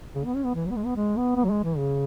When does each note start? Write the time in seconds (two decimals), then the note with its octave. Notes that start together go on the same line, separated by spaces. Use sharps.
0.15 C#3
0.25 B3
0.35 C#4
0.45 B3
0.55 E3
0.66 F#3
0.71 B3
0.76 G#3
0.86 B3
0.96 G#3
1.17 B3
1.36 B3
1.44 F#3
1.50 G#3
1.64 E3
1.78 C#3